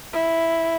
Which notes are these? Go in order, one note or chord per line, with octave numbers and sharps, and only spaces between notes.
E4